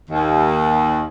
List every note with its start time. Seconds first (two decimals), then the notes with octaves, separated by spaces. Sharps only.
0.10 D#2